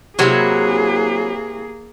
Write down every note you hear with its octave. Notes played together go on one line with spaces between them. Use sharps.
C3 F#3 A#3 E4 F#4 G#4